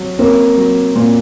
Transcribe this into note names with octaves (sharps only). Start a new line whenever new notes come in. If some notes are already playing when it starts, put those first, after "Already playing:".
Already playing: F#3
A#3 C4 C#4
F#3
A#2